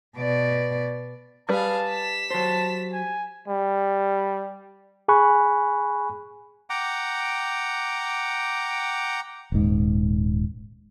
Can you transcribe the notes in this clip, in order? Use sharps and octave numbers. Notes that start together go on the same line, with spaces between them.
B2 D5
G3 G#4 B4 F5 A5
B6 E7
F#3 C5 A5
G#5
G3
G#4 G#5 B5 C#6 F#6
F#5 G5 A#5 D6
D#1 G#2